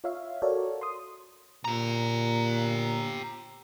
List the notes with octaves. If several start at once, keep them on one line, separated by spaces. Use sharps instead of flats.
F4 C#5 E5 F5
F#4 A4 A#4 C#5 D5
C6 D#6
A#2 G4 A#5